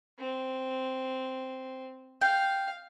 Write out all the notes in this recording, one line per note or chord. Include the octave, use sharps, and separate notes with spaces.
C4
F5 G5